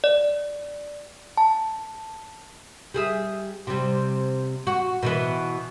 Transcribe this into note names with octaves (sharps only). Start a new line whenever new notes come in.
D5
A5
G3 G#4 E5
C3 G3
F#4
B2 E3 B3